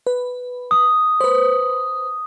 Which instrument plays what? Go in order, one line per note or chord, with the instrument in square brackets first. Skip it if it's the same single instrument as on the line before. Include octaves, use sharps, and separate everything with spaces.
[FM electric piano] B4
[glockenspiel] D#6
[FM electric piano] B4 C5